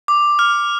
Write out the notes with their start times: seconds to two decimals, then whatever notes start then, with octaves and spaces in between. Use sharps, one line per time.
0.08 D6
0.39 F6